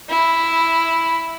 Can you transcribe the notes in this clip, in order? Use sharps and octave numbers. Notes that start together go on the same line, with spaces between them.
E4